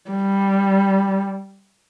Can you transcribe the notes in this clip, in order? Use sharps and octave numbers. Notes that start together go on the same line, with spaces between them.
G3